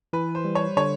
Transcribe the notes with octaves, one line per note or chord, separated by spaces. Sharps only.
E3 B4
C5
G3
C#5
D3 C#5